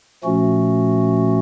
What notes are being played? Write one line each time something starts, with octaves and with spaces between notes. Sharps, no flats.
A#2 F3 A3 C#4 F#4